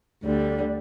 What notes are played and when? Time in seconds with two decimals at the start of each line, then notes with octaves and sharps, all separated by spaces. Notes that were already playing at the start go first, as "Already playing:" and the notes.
0.22 D2 D3 G3